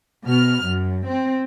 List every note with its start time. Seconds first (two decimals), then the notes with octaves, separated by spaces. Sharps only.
0.24 B2 F6
0.66 F#2
1.08 C4